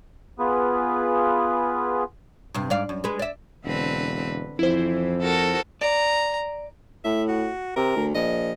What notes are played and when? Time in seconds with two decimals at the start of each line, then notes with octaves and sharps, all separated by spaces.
0.39 B3 F4 G#4 B4
2.54 G2 C3
2.70 G#2 D5 F5
2.89 F#2
3.04 G#3 B4
3.19 D5 E5
3.65 E1 D3 C4 B4
4.59 F2 E3 E4 C5
5.23 F#4 A4 A#4
5.81 D5 A#5
7.05 A2 E5
7.28 F#4
7.76 C3 A#4
7.96 D2
8.15 A#1 D#5